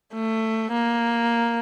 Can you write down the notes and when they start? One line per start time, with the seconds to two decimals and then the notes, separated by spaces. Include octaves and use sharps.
0.14 A3
0.72 A#3